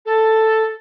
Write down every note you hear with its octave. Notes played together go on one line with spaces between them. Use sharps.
A4